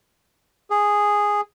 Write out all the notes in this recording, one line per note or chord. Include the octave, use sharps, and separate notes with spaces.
G#4